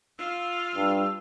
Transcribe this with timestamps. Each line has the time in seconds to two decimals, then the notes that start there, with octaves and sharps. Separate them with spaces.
0.18 F4 F5 E6
0.75 G2